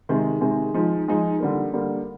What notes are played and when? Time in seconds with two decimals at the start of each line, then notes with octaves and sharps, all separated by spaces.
0.09 C3 D#3 G#3
0.41 C3 D#3 G#3
0.74 F3 G#3 D#4
1.08 F3 G#3 D#4
1.40 D3 G3 A#3
1.73 D3 G3 A#3